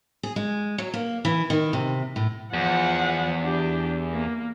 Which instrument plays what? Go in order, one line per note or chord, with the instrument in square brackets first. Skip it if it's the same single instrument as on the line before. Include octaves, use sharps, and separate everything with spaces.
[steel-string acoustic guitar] G#4
G#3
F#3
A#3
E3
D#3
C3
A2
[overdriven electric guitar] E2 [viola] F3 F#5
[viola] D4 G4
A#3